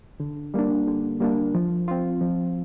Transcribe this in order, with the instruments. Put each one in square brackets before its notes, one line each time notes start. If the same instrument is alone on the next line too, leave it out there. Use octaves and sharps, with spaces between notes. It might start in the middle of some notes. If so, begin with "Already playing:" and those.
[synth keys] D3
G3 A#3 D4
D3
G3 A#3 D4
F3
C4 F4
F3